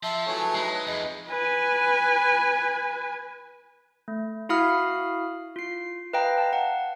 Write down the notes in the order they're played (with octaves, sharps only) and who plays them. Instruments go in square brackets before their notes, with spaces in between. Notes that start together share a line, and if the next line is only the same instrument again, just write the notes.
[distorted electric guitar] F3 [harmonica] E5 C6 [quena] A5
[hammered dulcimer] E3 G#4 [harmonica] F#3 A3 C#5
[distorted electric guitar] G#3 [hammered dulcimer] D#4 B4
[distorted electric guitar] F2 [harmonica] G#3 [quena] D#5
[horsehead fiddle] B4 G#5
[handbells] A3
E4 F#4 F5 B5 D#6 F6
F4 C7
B4 D#5 F5 G5 A#5
F5 A5
F#5